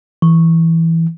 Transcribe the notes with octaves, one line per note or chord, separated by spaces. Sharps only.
E3